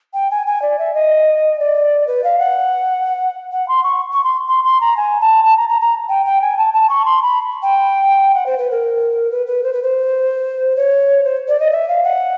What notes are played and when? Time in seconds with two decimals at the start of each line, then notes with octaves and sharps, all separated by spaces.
0.14 G5
0.31 G#5
0.47 G#5
0.62 D5
0.79 E5
0.94 D#5
1.60 D5
2.07 B4
2.24 F5
2.39 F#5
3.52 F#5
3.68 C6
3.84 C#6
4.13 C#6
4.24 C6
4.49 C6
4.64 C6
4.81 A#5
4.97 G#5
5.21 A5
5.45 A5
5.57 A#5
5.69 A#5
5.81 A#5
6.09 G5
6.26 G5
6.42 G#5
6.58 A5
6.74 A5
6.89 C#6
7.05 C6
7.22 B5
7.63 G5
8.34 F#5
8.46 C5
8.58 B4
8.71 A#4
9.31 B4
9.47 B4
9.63 C5
9.73 B4
9.83 C5
10.76 C#5
11.24 C5
11.48 D5
11.60 D#5
11.72 E5
11.88 F5
12.04 F#5